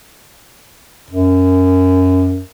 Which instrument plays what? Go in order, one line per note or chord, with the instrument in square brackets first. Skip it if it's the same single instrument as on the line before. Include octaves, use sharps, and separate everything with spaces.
[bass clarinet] F#2